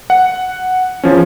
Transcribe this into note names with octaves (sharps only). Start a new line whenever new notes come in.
F#5
E2 F3 C#4